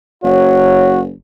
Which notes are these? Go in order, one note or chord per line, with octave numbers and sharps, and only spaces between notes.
F#1 F#4 C#5